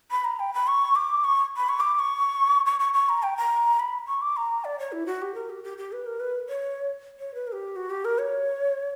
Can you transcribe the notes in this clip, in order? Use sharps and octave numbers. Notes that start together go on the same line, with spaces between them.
B5
A#5
G5
B5
C#6
D6
C#6
B5
C#6
D6
D6
C#6
C#6
C#6
C#6
A#5
G5
A#5
B5
C#6
D6
A#5
D5
C#5
E4
F#4
G4
A#4
G4
G4
G4
B4
A#4
B4
C#5
C#5
B4
A#4
G4
F#4
G4
A#4
C#5